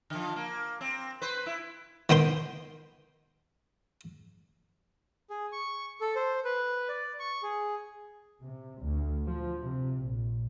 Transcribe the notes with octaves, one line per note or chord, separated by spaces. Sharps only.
D3 F3
A#3
C4
B4 C5
E4
D#3 B3 G5 C6
G#4
C#6
A4
C5
B4
D5
C#6
G#4
C3
D2
F3
C3
A#1